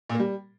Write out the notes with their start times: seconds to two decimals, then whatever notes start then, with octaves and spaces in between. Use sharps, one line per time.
0.09 A#2
0.15 A#3
0.20 G3